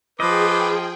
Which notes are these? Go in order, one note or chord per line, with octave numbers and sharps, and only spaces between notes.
F3 G#4 B4 D#5 G5 D6